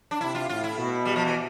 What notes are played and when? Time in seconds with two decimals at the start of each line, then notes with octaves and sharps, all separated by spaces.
0.11 D4
0.21 C3 E4
0.35 F4
0.49 A2 F4
0.64 E4
0.78 B2
1.05 G3
1.16 F3
1.25 E3